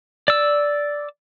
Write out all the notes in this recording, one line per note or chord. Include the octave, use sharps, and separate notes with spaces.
D5 E6